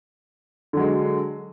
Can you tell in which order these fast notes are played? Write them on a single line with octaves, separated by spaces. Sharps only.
D3 F#3 G#3